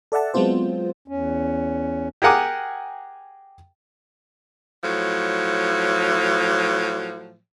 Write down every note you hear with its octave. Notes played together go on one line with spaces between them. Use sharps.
A4 D5 E5 F#5 A5
F#3 G#3 B3 C4 F4 C5
E2 C#4
G4 G#4 A#4 F#5 G#5 D6
A2 F3 F#3